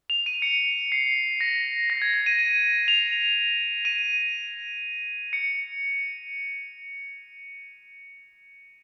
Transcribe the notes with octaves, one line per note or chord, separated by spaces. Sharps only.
F7
D#7
C#7
C7
A#6
A#6
G#6
G#6
D#7
D#7
F7
D#7
C#7